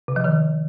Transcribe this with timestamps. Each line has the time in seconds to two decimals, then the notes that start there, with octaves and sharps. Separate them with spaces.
0.08 C3
0.16 F3
0.24 D#3